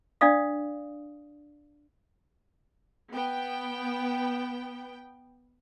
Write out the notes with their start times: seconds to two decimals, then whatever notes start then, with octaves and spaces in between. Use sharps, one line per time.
0.21 D4 D5 F5 D#6
3.11 B3 G5